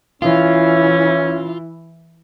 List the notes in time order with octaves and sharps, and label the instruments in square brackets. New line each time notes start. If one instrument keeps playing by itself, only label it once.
[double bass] E3 E4 [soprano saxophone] C#4 [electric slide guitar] F4